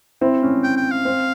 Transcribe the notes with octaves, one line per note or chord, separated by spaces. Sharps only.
C4 E4
C#4
G5
G5
F5
C4